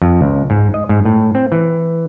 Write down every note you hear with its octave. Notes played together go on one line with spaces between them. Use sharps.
F2
C#2
G#2
D#5
G#2
A2
C4
E3